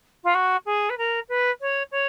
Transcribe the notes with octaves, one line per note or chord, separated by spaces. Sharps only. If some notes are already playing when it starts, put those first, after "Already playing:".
F4
F#4
G#4
B4
A#4
B4
C#5
C#5